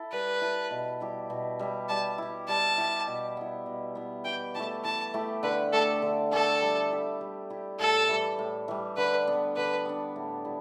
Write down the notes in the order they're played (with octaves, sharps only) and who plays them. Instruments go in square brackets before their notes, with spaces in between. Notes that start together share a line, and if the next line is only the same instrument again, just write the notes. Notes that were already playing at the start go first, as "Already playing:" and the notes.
Already playing: [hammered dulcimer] E4 A4
[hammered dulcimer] G3 [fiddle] B4
[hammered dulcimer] E4 A4
B2
G3 E4 G4
B2
G3 E4 G4
[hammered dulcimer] G3 [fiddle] A5
[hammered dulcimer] E4 G4
[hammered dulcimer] G3 [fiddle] A5
[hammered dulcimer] E4 G4
B2
B3 E4
B2
B3 E4
[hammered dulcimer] E3 [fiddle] G5
[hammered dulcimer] A3 E4 G4 [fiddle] A5
[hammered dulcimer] E3 [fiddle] A5
[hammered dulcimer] A3 E4 G4
[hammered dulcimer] D3 [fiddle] B4
[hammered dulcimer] A3 G4 [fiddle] A4
[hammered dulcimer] D3
[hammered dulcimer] A3 G4 [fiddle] A4
[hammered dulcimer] G3
E4 G4
G3
E4 G4
[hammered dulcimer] A2 [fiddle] A4
[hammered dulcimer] E3 G3
A2
E3 G3
[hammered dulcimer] D3 [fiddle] B4
[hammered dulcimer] B3 D4
[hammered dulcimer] D3 [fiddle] B4
[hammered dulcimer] B3 D4
A2
G3 E4